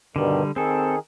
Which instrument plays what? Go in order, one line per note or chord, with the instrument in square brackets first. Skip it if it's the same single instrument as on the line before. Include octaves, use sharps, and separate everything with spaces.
[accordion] G2 B2 D#3 [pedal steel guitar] D3 G3
[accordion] D#3 G#4 [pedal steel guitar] C4 A4